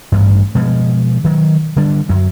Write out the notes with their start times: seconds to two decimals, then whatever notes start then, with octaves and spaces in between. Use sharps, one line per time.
0.12 A1 G2
0.55 B2 F3 G#3
1.24 D#3 F#3
1.76 D3 G3 D4
2.09 F#2 F#3